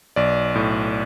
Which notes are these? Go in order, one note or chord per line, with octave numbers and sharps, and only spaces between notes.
B1 D5
A2